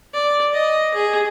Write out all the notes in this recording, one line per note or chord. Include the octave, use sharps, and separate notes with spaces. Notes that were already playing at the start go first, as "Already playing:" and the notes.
D5
D#5
G#4